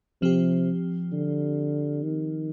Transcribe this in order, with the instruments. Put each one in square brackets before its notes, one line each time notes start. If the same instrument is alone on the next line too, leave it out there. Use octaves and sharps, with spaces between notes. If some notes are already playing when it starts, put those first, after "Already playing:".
[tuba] C3 [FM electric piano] F3 C4 G4
[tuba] D3
D#3